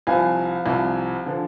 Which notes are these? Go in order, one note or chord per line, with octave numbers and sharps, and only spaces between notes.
C2 C3 F3 F5 G#5
C2 C3 F3
D3 F3